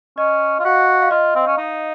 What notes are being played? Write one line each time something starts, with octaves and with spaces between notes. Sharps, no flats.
C#4 D#5
F4
F#4 F5
F5
F4 D#5
C4
C#4
D#4